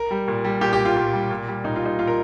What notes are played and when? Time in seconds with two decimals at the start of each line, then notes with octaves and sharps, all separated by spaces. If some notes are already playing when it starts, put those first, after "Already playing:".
Already playing: A#4
0.11 G3
0.28 A#2
0.44 G3
0.61 A#2 G4
0.73 G4
0.78 G3
0.85 F4
0.96 A#2
1.13 G3
1.31 A#2
1.48 G3
1.64 A#2 D#4
1.76 F4
1.82 G3 D#4
1.99 A#2 F4
2.07 A#4